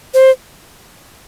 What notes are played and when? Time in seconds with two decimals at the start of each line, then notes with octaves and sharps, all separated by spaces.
0.14 C5